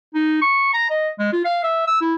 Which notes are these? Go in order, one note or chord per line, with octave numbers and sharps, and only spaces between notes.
D#4
C#6
A#5
D#5
G#3
F4
F5
E5
E6
E4